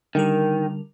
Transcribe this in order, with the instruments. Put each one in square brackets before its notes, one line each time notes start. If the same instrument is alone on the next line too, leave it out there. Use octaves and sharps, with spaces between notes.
[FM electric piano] D3 G3 A#4 [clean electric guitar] D#3